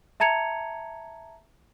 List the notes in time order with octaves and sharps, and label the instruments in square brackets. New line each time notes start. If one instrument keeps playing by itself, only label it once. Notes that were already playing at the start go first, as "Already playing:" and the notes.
[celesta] E5 A5 A#5 G#6 C#7 F7